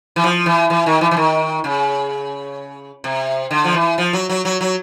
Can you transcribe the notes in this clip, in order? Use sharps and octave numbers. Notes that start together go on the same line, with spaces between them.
E3
F3
E3
E3
D#3
E3
E3
D#3
C#3
C3
D3
F3
E3
F3
F#3
F#3
F#3
F#3